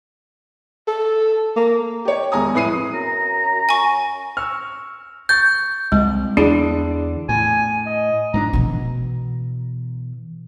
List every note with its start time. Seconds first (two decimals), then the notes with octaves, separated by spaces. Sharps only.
0.87 A4
1.57 A#3
2.05 G4 C#5
2.32 E1 G#5 A#5 D#6
2.54 F2 A2 B4 D#6 C7 D#7
2.93 F#2 A#5
3.69 G#5 C#6
4.37 C#6 E6 F6
5.29 C#6 G6 A6
5.92 C2 G#3
6.37 E2 D3 D4 E4 G#4
7.29 A2 G#5
7.86 D#5
8.34 G#2 F3 D4 A#5
8.53 B2 E3